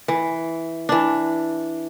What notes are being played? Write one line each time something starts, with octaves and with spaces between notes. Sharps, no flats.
E3
E3 D4